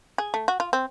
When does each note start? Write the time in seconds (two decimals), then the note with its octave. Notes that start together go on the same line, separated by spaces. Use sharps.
0.18 G#4
0.34 A3
0.48 F#4
0.60 F4
0.73 C4